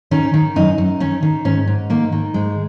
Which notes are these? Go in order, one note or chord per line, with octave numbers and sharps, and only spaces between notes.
D#3 C#4
D#3
F#2 D#4
F#2
D#3 C#4
D#3
G#2 C#4
G#2
D#3 A#3
D#3
G#2 G#3